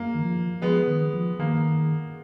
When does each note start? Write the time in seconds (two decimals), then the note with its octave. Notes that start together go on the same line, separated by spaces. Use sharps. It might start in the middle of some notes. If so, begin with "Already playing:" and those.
Already playing: A#3
0.15 D#3
0.22 F3
0.62 F3 G#3 B3
0.87 D#3
1.14 F3
1.39 D#3 A#3